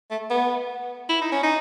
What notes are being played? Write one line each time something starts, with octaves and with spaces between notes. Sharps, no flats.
A3
B3
E4
D#4
C#4
D#4